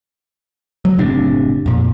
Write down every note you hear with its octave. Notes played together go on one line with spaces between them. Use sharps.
F#3
F#1 A2 C3 D4
F2 A#2